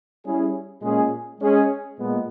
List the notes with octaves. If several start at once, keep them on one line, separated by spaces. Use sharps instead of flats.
G3 C#4 E4 G#4
A#2 G#3 C#4 G#4
G#3 C#4 G#4
A#2 G#3 B3